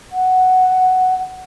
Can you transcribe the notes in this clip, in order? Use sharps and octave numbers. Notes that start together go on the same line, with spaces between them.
F#5